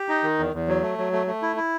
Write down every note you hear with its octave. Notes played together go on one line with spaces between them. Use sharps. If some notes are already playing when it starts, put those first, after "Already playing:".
Already playing: G4
D#4
D#3
E2
E2
F#3
A3
F#3
A3
A3
E4
E4